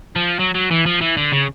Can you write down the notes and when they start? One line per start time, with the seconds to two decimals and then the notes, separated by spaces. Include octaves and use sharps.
0.16 F3
0.39 F#3
0.55 F#3
0.71 E3
0.86 F3
1.01 E3
1.17 D3
1.33 C#3